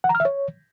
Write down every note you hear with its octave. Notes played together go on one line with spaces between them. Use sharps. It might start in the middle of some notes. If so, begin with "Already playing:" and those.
F#5
A#5
F6
E5
C#5